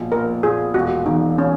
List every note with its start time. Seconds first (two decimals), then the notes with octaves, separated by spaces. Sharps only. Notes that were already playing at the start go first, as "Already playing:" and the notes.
Already playing: A#1 B2
0.12 A#1 A#4
0.43 A#2 G#4
0.74 E1 F#4
1.06 E2 D#4
1.38 C#4